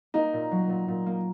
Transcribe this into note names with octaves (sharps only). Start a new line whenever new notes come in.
A#3 D#4
A#2
F#3
A#2
A#2
A#3